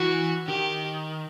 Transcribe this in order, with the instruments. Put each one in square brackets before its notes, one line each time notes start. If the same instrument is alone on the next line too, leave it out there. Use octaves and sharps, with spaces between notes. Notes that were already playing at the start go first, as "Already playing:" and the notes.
Already playing: [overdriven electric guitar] E3 [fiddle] F#4
[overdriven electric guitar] D#3 [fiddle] G4